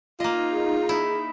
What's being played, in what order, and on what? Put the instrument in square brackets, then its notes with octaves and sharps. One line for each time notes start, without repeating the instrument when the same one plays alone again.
[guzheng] A#3 D#5 [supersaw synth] D#4 [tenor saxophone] F4
[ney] G#4
[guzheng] E4